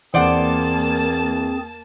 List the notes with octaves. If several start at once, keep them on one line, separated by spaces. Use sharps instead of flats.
E2 A#3 C4 G#4 C5 D5 F#5 A5